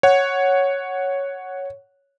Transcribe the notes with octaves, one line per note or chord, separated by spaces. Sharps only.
C#5 F#5